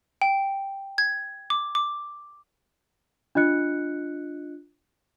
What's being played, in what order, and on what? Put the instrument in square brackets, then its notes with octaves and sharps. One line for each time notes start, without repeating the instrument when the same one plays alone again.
[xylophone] G5
G#6
D6
D6
[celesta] D4 F4 D#5 F#6 C#7